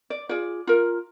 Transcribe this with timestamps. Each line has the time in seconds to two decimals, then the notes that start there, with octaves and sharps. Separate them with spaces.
0.10 D5
0.29 F4 G#4 D5
0.67 F4 A#4